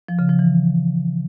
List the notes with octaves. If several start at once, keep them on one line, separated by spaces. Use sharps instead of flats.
F3
C#3
F3
E3